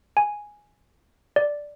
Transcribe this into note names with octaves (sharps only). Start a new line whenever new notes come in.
G#5
D5